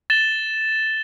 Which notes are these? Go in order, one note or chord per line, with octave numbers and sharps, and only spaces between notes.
A6 E7 G7